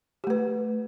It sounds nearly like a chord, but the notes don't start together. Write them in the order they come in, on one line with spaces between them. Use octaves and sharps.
G4 A3 B4